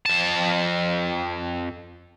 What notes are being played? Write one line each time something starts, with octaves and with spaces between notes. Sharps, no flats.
F2 A5